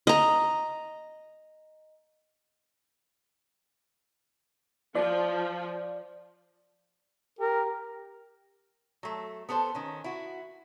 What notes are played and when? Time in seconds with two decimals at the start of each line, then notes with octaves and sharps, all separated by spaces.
0.07 D#5 A#5
4.95 F3 D5
7.39 G4 A#4
9.03 F#3 A3
9.49 B3 A4 A#4 C5
9.75 D#3 C#4
10.04 E4 F#4